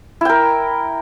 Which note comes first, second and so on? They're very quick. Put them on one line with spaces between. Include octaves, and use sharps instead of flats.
E4 G5 A#4